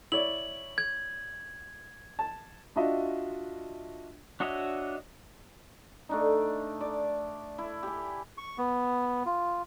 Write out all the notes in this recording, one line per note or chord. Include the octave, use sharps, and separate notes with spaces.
E4 C#5 D5 F#7
G#6
A5
D4 F4 F#4 D#5 E5
D4 F#4 C#5 D#5 E5
A3 D4 D#4
D5
E4
G4 G#5
C#6
B3
F4